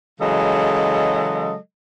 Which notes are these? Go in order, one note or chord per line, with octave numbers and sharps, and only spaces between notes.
C#3 E3 F#3 G#3 A4 D#5